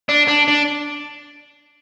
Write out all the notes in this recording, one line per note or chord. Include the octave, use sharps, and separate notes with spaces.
D4
D4
D4